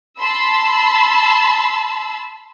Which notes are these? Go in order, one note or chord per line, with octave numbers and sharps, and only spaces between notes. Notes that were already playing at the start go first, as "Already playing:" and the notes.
A5 B5 C6 E6